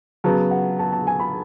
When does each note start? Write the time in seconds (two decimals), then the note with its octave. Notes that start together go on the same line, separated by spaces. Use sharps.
0.24 C#3 F#3 B3 A5
0.51 F#5
0.79 A5
0.92 A5
1.07 G#5
1.20 B5